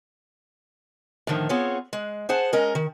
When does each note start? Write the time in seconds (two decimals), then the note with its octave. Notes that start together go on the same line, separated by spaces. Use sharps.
1.27 A2 D3 D#3 F3
1.49 B3 C4 F4 G#4 C#5
1.93 G#3
2.29 G#4 C5 F#5 A5
2.53 G#3 C#4 A#4 D#5
2.75 D#3